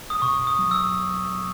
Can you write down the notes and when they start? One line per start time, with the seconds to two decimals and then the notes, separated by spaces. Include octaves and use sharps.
0.10 D#6
0.22 B2 C#6
0.47 D#6
0.59 F#3
0.71 E6